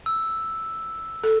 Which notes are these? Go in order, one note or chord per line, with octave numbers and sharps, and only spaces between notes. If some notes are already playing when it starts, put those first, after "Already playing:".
E6
A4